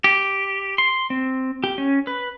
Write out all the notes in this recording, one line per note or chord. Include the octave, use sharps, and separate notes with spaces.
G4
C6
C4
G4
C#4
B4